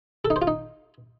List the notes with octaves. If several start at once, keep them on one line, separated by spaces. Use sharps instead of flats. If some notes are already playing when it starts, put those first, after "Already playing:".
A4
D#4
C5
F4
D#4